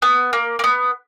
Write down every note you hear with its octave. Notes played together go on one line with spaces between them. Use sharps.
B3
A#3
A#3
B3